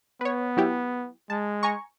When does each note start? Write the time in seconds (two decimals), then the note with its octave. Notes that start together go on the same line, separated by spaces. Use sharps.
0.21 B3 B4 C#5
0.57 F#3 E4 G4
1.30 G#3 A5
1.63 G#5 A#5 C#6